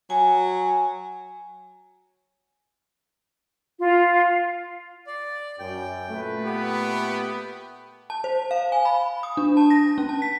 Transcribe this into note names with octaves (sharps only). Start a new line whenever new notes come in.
F#3 G#5
F4
D5
F#2 G5
A#2 A3 B4
B3 G4
A5
C5
F5
G#5
B5
D#6
D4
A5
A#6
C#4
A5
B6